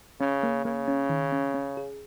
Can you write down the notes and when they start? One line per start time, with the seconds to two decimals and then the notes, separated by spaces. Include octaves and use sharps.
0.21 C#3 C#4
0.43 A#3
0.65 C#3 A#3
0.88 C#4
1.09 D#3
1.32 C#4
1.54 C#4
1.77 G#4